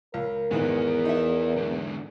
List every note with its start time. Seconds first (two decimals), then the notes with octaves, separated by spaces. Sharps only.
0.14 C#2 A#4
0.51 E2 G#2 D#3 E3 B3 E4
1.05 D#4 E5
1.56 G#2 D3